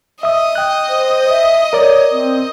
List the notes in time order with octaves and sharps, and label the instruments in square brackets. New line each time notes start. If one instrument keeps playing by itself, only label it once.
[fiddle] D#5 [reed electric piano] E5 D#6
[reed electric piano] G5 F#6
[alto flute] C5
E5
[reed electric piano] A#4 D5 [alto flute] C#5
[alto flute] C4